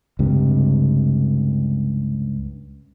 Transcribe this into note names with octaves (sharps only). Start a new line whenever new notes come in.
C#2 G2 C3